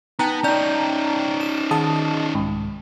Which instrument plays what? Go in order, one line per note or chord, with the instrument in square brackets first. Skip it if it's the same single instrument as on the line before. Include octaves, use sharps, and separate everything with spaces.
[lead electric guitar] B3 [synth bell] D#4 [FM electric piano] G5 A5 A#5
[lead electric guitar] C#4 D#4 [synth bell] D5 G6
[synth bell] E7
[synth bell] D#3 [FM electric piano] D#5 A5 D#6
[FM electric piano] C2 G#2